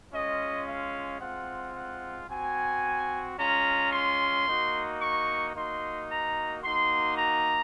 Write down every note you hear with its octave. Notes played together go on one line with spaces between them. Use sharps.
G#3 C#4 F4 D#5
F5
G#3 C4 F4 F#5
F#5
C4 F#4 G#5
G#3 C#4 F4 A#5
C6
A#3 D#4 F#4
C#6
A#3 D#4 F#4 C6
A#5
A#3 D#4 F#4 C6
A#5